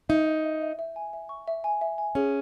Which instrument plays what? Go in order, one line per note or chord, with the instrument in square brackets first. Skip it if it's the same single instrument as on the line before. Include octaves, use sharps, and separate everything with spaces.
[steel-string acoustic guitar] D#4 [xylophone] E5
[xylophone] E5
E5
E5
E5
G#5
E5
C#6
E5
G#5
E5
G#5
[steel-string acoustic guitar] C#4 [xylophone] G#4